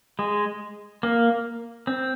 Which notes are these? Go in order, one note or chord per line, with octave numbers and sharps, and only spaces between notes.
G#3
A#3
C4